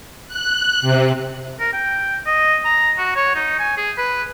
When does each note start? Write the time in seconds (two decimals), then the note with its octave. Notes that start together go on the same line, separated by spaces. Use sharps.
0.27 F#6
0.81 C3
1.60 A#4
1.73 G5
2.26 D#5
2.65 A#5
2.98 F#4
3.16 C#5
3.36 D#4
3.59 G#5
3.77 G#4
3.98 B4